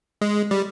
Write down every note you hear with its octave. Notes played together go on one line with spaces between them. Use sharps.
G#3
G3